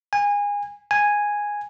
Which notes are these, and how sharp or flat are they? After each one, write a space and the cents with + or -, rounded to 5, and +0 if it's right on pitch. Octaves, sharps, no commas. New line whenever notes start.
G#5 -25
G#5 -5